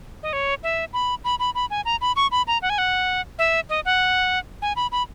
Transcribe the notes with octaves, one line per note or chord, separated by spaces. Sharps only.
D#5
C#5
E5
B5
B5
B5
B5
G#5
A#5
B5
C#6
B5
A#5
F#5
G#5
F#5
E5
D#5
F#5
G#5
B5
B5